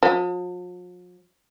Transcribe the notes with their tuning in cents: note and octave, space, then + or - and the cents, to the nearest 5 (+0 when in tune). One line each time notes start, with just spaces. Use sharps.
F3 +45